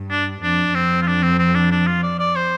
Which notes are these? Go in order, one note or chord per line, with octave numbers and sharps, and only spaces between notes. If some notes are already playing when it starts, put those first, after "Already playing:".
Already playing: G2
D4
F2 D4
F2 C4
F4
D4
C4
C4
D4
D4
F4
D5
D5
C5